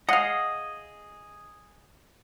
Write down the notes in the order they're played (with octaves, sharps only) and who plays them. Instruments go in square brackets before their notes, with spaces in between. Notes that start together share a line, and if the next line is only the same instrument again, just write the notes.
[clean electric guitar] G#4 D#5 [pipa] F5 F#5